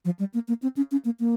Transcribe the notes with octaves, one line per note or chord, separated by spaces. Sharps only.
F3
G3
A#3
A#3
C4
C#4
C#4
A#3
A#3